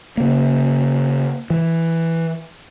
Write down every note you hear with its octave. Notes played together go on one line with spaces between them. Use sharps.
C#3 A#3
E3